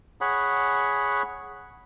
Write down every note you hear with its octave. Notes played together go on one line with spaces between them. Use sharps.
G#4 C#5 F#5 B5